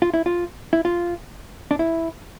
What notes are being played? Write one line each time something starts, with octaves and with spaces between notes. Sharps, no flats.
F4
E4
F4
E4
F4
D4
E4